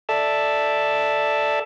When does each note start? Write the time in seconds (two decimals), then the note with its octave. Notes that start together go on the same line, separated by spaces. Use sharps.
0.09 A4 D5 E5 A5